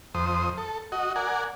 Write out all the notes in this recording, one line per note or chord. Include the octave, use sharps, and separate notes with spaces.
F2 C5 D#6
A4
F#4 D#5
A#4 D5 F#5 G#5